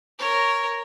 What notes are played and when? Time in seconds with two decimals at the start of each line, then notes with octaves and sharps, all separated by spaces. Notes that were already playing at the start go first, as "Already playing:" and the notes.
0.19 A#4 C#5